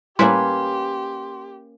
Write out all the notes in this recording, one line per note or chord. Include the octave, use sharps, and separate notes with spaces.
A2 G3 A#3 C#4 E4 G4 B4 C6